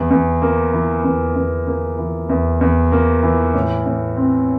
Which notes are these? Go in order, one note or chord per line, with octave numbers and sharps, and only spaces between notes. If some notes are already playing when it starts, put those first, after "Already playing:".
Already playing: E2
E2
A#3
E3
E2
E2
A#3
E3
E2
E2
A#3
E3
A2
A2
C4